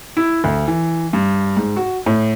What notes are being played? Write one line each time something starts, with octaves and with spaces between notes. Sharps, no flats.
E4
D2
E3
G2
G#2
F#4
A2